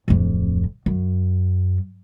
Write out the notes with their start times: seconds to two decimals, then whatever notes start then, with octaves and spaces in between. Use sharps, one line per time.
0.08 D1 F2
0.86 F#2